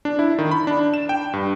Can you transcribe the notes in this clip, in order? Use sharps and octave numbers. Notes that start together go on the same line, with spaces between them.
D4
E4
D#3
B5
D4
E7
G5
G2